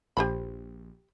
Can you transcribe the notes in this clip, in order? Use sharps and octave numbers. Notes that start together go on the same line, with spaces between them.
A#1 G4 C5 B5